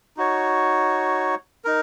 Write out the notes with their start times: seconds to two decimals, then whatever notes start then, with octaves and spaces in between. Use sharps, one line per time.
0.17 D#4 F#4 C#5
1.64 D#4 A#4